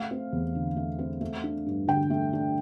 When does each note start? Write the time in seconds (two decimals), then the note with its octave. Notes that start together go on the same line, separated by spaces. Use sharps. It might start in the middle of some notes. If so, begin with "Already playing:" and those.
Already playing: A3 F5
0.11 C4
0.32 E2
0.55 D3
0.76 A3
0.99 C4
1.21 A3
1.44 D4
1.66 G2
1.88 D3 G5
2.10 A3
2.33 D4